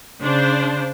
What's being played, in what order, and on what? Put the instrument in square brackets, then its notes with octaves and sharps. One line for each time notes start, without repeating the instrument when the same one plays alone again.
[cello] C#3 [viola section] D4 C5